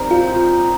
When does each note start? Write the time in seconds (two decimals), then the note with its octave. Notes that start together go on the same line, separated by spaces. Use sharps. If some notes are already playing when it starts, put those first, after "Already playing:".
Already playing: G3 C4 D#4 A#4
0.11 F4